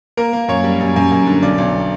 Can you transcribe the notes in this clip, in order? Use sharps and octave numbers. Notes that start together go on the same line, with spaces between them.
A#3 A#4
A#3
F#2 C#5
G3
F#2
F#2
F#2
D3
B1 D5
B1